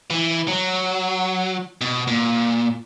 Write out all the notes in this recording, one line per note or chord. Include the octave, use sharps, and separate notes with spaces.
E3
F#3
B2
A#2